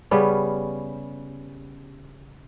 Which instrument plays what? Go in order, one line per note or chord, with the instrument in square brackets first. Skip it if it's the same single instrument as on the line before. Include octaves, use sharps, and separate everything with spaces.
[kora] C#3 G3 B3 C#4